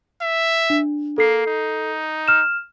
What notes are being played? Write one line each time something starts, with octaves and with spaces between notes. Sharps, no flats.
E5
D4
A#3 A4 C7
D#4
F6 E7